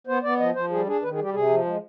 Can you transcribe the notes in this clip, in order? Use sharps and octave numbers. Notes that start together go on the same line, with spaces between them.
B3 C5
B3 D5
F3 D#5
F3 C5
G3 G#4
D4 G#4
D#3 B4
G#4
G3 G4
C3 G#4
F3
G#3